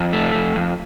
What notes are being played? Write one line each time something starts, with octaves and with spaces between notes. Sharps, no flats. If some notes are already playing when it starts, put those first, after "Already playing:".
Already playing: F2
A3
F2
F2